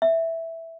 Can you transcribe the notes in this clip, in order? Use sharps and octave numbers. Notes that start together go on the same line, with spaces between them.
E5